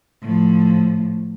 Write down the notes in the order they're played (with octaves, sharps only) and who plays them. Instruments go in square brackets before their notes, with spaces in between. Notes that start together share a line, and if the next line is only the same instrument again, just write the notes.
[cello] A2 F3